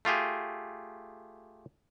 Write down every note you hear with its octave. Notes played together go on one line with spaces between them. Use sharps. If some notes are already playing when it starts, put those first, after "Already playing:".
A3 F4 G4 G#4